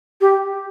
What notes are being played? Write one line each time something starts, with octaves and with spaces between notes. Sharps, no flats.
G4